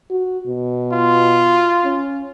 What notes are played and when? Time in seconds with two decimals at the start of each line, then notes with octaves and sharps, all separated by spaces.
0.11 F#4
0.47 B2
0.93 F4
1.84 C#4